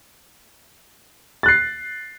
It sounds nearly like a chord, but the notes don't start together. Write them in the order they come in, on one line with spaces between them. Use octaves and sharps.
A6 F#6 C7